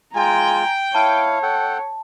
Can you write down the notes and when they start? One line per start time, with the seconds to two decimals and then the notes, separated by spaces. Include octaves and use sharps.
0.15 G#3 F4 G5 G#5 A#5
0.95 E4 C#5 F5 A5
1.43 A4 F#5 G5